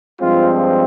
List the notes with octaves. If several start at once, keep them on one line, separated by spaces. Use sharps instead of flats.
G2 F3 G#3 C4 F4